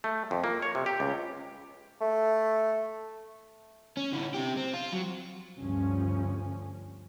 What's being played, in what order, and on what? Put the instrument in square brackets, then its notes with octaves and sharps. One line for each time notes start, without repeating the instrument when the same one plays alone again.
[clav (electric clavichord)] A3
F2
A#3
C#5
C3
G4
C#2
[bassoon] A3
[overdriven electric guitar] C#4
D3 E3
C3 G4
C4
F4
F#3
[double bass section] D2 G2 F3 C#4